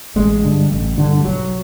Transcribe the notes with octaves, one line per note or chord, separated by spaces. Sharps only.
A1 G#3
G2 D3
A1
G2 D3
G3
B1 F#3